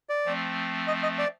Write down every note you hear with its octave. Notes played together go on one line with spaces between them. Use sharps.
D5
F3 A3 C4
D#5
D#5
D5